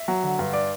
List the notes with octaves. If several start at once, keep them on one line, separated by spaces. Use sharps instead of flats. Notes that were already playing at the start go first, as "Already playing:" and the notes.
Already playing: E5
F#3
D3
G2
D5